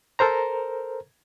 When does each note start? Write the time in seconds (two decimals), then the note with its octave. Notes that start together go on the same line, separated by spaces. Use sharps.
0.19 A4 A#4 C5 A#5